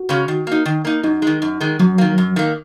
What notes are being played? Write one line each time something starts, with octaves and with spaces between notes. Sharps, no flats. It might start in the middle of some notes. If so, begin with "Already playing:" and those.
Already playing: F#4
C#3 G#3 C#4
D#3
A#3 D#4
D#3
A#3 D#4
F#2 D#4
D#3 G#3
F#2
D#3 G#3
F#2 F#3
D#3 A#3
F#2
D#3 A#3